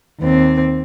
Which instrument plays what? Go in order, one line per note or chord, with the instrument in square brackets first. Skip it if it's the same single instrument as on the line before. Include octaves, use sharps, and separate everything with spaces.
[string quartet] D#2 C4